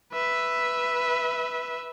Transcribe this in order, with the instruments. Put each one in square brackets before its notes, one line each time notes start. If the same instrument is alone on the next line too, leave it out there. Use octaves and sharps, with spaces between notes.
[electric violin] B4 E5